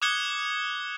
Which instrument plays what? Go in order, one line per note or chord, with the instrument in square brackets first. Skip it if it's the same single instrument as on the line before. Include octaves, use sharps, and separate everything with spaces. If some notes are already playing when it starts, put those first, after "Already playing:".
[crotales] D6 D#6 F#6 G#6 C#7 G7